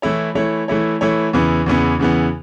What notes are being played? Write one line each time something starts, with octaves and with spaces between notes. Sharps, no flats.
E3 A3 E4 C#5
E3 A3 E4 C#5
E3 A3 E4 C#5
E3 A3 E4 C#5
E2 C#3 E3 B3
E2 C#3 E3 B3
E2 C#3 E3 B3